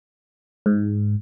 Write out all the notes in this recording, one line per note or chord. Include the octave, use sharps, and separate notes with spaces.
G#2